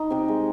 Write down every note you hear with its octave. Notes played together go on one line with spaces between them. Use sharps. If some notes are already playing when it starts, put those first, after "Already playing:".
Already playing: D#4
C3 G4
G#3